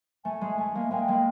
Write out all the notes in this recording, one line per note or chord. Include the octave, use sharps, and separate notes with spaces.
A3 G#5
G#3
A3 G#5
G#3 A#3
G#3 A#3 G5
G#3 A#3